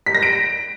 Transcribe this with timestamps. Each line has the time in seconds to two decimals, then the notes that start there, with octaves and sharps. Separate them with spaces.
0.06 B6
0.15 A#6
0.23 D7